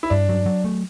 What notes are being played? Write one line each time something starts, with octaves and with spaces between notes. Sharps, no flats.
E4
G2 D4
F#3
F#3
A3